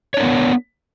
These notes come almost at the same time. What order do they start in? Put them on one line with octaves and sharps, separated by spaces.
C#5 D4 A#4 B3